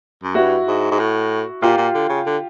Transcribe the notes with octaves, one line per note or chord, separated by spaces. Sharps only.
F#2
G2 E4 F#4
G#2
G#2
A2
A#2 F4 G4
A#2
D3
C#3
D3